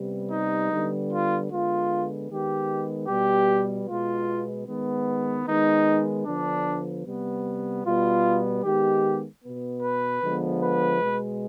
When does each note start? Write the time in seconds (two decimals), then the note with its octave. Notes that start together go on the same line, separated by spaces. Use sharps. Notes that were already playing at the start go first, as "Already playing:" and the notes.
Already playing: C3 G3 B3
0.32 D#4
0.71 D3 G3 B3
1.11 F4
1.50 D3 G#3 B3 F4
2.29 D#3 G#3 B3 G4
3.08 B2 G3 B3 G4
3.88 B2 G#3 B3 F4
4.67 D#3 G#3 B3
5.46 D#3 G#3 B3 D#4
6.25 D3 F3 B3 D4
7.05 C3 G3 B3
7.85 B2 G3 B3 F4
8.63 D#3 G#3 B3 G4
9.43 B2 B3
9.82 B4
10.22 D3 F3 G#3 B3
10.62 B4
11.01 B2 G#3 B3